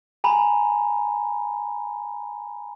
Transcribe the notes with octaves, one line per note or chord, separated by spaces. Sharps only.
G#5 A#5 B5